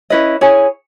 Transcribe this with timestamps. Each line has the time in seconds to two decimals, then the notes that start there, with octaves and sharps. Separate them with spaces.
0.10 C#4 E4 B4 D#5
0.41 E4 G#4 C#5 G#5